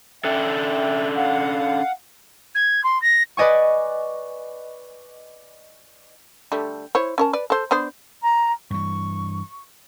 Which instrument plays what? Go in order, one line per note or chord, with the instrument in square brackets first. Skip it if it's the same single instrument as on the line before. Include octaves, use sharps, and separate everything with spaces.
[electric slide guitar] C#4 D4 A4 [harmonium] E5 G5
[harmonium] F5 F#5
[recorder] G#6
C6
A#6
[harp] B4 D5 D#5 G#5 C#6
[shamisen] D3 G3 A3
E4 C5 C#5
C#4 A#4 A5
B4 D5
A4 C5
B3 D4 C5
[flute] A#5
[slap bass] G2 E3 [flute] C#6